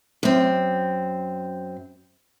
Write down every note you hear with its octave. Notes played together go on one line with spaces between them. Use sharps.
F#2 C4